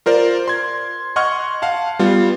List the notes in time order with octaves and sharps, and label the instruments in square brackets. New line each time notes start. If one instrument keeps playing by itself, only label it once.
[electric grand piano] F4 A#4 C5 D5
C6 G#6
D#5 F#5 C6 C#6 F6 G#6
F5 F#5 A5
G3 B3 F4